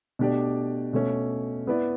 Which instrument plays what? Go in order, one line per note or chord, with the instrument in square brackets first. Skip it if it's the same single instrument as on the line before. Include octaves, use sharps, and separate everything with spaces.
[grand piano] B2 A3 D4 G4 D5
B2 A3 C#4
B3 E4 B4 D5